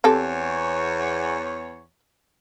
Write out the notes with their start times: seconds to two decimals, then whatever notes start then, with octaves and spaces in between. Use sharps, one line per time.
0.04 E2 C4 G4 A4 C#5